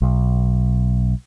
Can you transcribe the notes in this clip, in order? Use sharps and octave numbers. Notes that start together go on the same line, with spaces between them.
B1